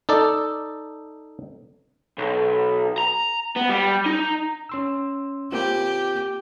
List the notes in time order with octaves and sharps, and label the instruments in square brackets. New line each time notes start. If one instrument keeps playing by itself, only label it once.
[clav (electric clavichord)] D#4 A4 D5 A5
[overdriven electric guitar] B1
A#5
B3
G3
D#4
[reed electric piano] C#4 C6 E6
[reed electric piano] A#3 C4 F4 [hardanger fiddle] G4